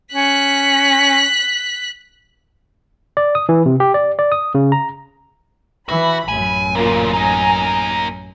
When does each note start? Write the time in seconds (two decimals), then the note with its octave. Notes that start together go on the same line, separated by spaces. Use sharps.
0.14 C#4 F#6 B6
3.17 D5
3.35 D#6
3.49 E3
3.66 C3
3.80 G4
3.94 D5
4.19 D5
4.32 D#6
4.55 C#3
4.72 A#5
5.89 E3 F#4 B5
6.28 A1 F#2 G#5
6.75 A#2 C#3 A#3 F4
7.13 A#3 D#4 G#5 A#5